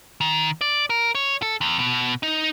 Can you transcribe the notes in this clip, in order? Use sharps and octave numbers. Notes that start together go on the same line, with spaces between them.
D#3
D5
A#4
C#5
A4
E2
B2
D#4